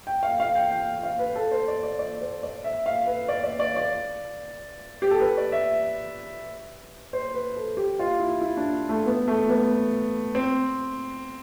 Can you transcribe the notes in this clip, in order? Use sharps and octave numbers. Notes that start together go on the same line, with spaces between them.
G5
F5
F5
G5
G5
F5
B4
A4
C5
D5
D5
D5
C5
D5
E5
F5
B4
D5
D5
D5
D5
G4
A4
B4
D5
E5
C5
B4
A4
G4
F4
E4
E4
D4
A3
B3
A3
B3
C4